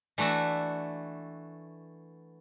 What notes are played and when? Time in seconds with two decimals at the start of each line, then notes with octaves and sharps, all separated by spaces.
0.18 E3 A3 D4 F#4 E5